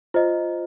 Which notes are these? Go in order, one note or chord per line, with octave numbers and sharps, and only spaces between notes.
F4 C5 D#5